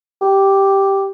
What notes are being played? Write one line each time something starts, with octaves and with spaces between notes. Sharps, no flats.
G4